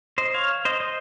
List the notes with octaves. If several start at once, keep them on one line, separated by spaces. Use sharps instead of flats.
C5 D#5
C#5 F5
C5 D#5
C5 D#5